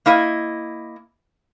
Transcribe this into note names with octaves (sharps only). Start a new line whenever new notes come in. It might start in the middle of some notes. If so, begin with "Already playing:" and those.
A#3 E4 D#5